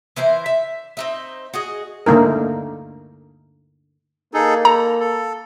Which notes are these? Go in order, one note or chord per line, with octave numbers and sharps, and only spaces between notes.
E3 E4 C5 A#5
E5
C4 D#4 E5
F#4 G#4 D#5
D3 A3 A#3 D#4 A#4
A#3 D#4 G#4 A4
A4 A#5
A4